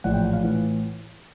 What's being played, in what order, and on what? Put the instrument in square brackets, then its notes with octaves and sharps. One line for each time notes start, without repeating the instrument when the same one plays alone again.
[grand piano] A#1 A2 E3 F#5
G5
F#5
F5
A2 E3 F#5